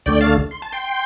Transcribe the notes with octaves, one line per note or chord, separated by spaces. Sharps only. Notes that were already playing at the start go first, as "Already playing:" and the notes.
D2 D3 A3 D5 G5
F5 A5
C6
A5
G5 C6